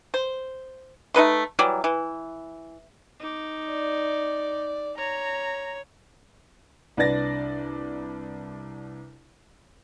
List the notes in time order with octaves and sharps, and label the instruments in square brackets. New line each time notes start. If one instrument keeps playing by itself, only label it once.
[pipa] C5
A3 D#4 B4 C6
E3 F#3 G3 D5
E3
[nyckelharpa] D#4 D6
[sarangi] D5
[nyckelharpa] C#5 [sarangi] A#5
[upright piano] C2 D4 B4 D5 A6 A#6